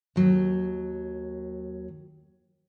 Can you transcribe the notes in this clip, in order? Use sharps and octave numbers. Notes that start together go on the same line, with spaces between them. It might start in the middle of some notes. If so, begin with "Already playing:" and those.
D#2 F#3